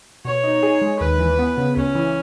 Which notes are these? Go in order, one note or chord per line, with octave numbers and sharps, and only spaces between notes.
B2 C#5
D#4
G#4
G#3
D#2 B4
E3
B3
C#3
C#2 C#4
E3